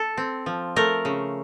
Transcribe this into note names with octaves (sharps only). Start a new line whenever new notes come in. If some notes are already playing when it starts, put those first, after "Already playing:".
Already playing: A4
C4
F3
A3 A#4
C#3